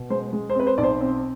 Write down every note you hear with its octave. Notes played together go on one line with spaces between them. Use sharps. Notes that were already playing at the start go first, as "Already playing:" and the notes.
Already playing: B2
G#3 C5
G#3
C5
C4 B4
C5
B1 D5
C5
C4